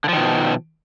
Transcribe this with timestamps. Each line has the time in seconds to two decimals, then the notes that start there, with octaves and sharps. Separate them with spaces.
0.04 D3
0.09 F3
0.13 D#3
0.17 B2